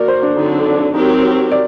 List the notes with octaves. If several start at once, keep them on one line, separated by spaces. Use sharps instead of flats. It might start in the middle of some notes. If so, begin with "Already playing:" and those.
Already playing: A#3 F#4 A#4 D5
C5
D4
D3 F#3 C4 D#4
D4
D4
F#3 C4 D#4 G4 A#4
D5